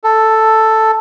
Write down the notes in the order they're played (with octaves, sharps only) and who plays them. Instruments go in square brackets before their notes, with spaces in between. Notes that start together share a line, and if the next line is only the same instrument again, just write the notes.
[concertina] A4